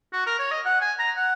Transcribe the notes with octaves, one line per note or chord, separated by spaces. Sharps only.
F#4
A#4
C#5
D#5
F#5
G#5
A#5
F#5